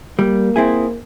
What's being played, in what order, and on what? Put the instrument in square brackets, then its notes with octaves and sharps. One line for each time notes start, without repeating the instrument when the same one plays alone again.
[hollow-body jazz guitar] G3 [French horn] A#3
[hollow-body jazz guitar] C4 E4 G#4